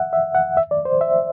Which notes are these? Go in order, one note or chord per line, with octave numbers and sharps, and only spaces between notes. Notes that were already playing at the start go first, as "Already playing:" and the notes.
Already playing: E5 F#5
E5
F#5
E5
D5
C5
E5